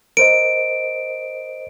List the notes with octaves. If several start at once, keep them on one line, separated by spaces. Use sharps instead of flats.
A#4 C5 D#5 D7